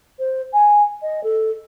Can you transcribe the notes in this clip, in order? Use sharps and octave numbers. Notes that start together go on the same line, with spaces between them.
C5
G#5
D#5
A4